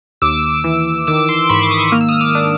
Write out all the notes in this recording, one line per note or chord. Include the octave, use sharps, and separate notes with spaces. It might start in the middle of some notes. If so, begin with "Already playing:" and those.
D#2 D6 E6
E3
D#3 D6 E6
C6 D6
G#2 B5 C#6
D6
C#6 D#6
A#3 F6
E6
D#6 F6
D6 E6
D4